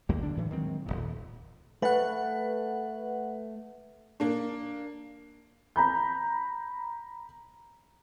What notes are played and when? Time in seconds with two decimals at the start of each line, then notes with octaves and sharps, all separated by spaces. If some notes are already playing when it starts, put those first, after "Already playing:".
0.09 G#1 D#2 G3 A#3
0.22 D3 D4
0.37 A2 E3 F#3
0.50 D#3 F#3 G#3 C4
0.86 D#1 G#1 A#2
1.82 A3 B4 F#5
4.20 A#3 D4
5.76 A#5 B5 G6